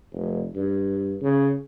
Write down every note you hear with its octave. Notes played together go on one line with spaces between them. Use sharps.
F1
G2
C#3